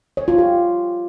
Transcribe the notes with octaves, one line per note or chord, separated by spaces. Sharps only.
C#5
F4
G4